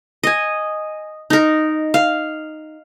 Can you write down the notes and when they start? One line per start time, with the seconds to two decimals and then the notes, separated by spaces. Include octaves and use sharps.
0.23 D#5 G#5
1.30 D#4 A#4
1.94 F5